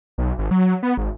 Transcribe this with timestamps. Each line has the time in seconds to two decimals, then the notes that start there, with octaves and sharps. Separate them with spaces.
0.18 B1
0.38 G#1
0.51 F#3
0.83 B3
0.98 G#1